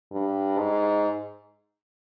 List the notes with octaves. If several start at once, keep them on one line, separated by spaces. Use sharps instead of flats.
G2
G#2